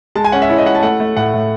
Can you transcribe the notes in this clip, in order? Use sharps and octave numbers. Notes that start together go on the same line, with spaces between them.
G#3 A5
G#5
C#4 F#5
E5
E4 C#5
D#5
E4 F#5
A5
A3 F#5
A3
A2 F#5
A2